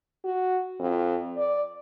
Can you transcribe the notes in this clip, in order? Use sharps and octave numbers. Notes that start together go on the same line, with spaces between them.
F#4
F2
D5